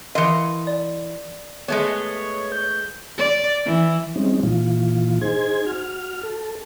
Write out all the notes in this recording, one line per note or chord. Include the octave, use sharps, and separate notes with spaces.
E3 A#4 D#5 F5 C6
D5
G#3 A3 B3 C#5
G6
D5
E3
G3 G#3 C4 C#4 D#4
A#2 E3 F4
D#4 G#4 C5 G#6
F#4 F6
A4